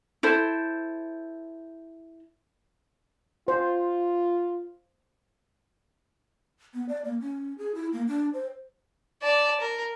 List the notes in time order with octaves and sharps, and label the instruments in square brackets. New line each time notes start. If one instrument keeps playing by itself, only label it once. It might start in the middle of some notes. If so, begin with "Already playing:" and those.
[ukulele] E4 A4 C5
[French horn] F4 [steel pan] C5
[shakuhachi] B3
D5
A#3
C#4
G#4
E4
A#3
D4
C5
[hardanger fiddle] D5 A5
A#4